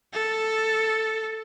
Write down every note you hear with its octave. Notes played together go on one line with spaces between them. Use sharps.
A4